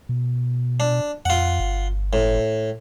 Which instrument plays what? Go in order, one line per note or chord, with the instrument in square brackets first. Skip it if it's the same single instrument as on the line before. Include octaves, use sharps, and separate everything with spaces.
[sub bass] B2
[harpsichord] D4
[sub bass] F2 [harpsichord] F4 F#5
[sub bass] G1
[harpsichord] A2